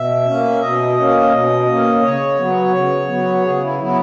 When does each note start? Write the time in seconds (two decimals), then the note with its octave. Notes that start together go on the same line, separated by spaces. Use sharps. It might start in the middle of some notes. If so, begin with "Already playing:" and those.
Already playing: B2 E5
0.26 A#3 C#4
0.61 B2 D#5
0.97 A#3 C#4
1.32 B2
1.67 A#3 C#4
2.02 C#3 C#5
2.37 F#3 B3
2.73 C#3
3.08 F#3 B3
3.44 C#3 G#4
3.62 E4
3.78 F#3 B3 E4